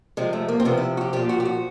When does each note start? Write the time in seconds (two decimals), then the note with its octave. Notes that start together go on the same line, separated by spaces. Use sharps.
0.17 C3 F3 G#3
0.33 A3
0.48 A#3
0.60 C4
0.65 C3 F3 B3
0.77 E4
0.97 F#4
1.01 G4
1.13 A#2 F3 G4
1.29 F#4
1.40 G4
1.45 F#4